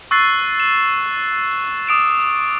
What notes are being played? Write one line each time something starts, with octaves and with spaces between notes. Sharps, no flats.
C#6 E6 F#6 A6 C7
E7
D6 D#6 D7 E7